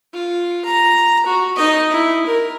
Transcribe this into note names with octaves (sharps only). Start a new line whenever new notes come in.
F4
A#5
F#4
D#4 D#5
E4
A#4